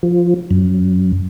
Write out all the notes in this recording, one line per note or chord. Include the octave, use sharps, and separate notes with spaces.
F3
F#2